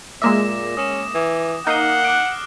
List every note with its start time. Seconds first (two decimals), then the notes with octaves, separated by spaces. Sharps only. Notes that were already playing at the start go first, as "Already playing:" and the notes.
0.22 A#2 G#3 A#3 E5 D6 A#6 E7
0.77 C#4 D#6 E7
1.14 E3
1.67 A#3 D#4 F#5 D#6 F6 C7 G7
2.04 D6 F#6 D7